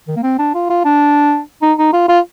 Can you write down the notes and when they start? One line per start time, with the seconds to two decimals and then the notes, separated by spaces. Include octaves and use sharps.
0.08 D#3
0.16 A#3
0.23 C4
0.39 D4
0.55 F4
0.70 F4
0.85 D4
1.62 D#4
1.78 D#4
1.93 F4
2.09 F4